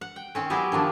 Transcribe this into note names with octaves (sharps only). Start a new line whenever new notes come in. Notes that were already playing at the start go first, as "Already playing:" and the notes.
F#5
G5
D#3 C4 C#4
F#3 B3 E4 G4 G#4
D#3 F3 A#3 D4